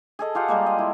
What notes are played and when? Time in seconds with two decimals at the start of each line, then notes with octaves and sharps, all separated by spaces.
0.19 G#4 A4 D#5
0.35 F4 G4 F5 F#5
0.48 G3 G#3 A#3
0.66 D#5
0.79 E4